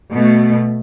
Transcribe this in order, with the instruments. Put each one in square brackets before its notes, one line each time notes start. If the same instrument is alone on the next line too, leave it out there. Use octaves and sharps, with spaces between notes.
[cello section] B2 A3